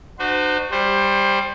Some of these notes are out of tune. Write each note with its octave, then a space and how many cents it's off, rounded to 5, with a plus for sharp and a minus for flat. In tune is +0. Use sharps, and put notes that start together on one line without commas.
D4 +45 F#4 +0 C5 -30
G3 +15 C5 +20